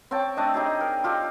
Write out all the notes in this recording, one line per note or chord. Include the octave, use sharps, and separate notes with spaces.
C4 C#5 G5 A5
A3 D4 D#5
D#4 G4 G#4
A#4
F4 G4 A4